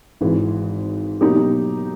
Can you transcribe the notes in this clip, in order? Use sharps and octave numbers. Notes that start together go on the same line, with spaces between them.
G#1 G#2 E3 G#3
B2 F#3 A#3 D#4 G4